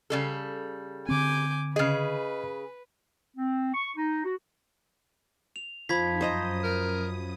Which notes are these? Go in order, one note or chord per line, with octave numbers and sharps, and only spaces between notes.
C#3 G3 A4
D3 C4 G#5 D6 G6
C#3 G#4 B4 D#5 F6
C4
C#6
D#4
F#4
F7
F2 F3 D#4 B5 G#6 B6
F#2 C5 D#5 A#5 D#6
A#4